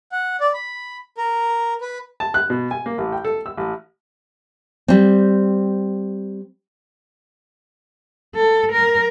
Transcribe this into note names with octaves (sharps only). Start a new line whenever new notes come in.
F#5
D5
B5
A#4
B4
A5
F#6
B2
G#5
A#3
A1
G5
A4
E6
A1
G3 C4
A4
A#4